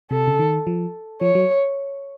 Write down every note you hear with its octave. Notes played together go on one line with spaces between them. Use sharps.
C3 A4
C#3
D#3
F3
F3 C#5
F#3